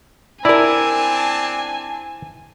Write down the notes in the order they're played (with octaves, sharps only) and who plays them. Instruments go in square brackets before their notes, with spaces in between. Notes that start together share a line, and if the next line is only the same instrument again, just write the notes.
[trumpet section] C4 D4 A5 [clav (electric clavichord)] E4 [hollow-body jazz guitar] A#4 D5 [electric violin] G#5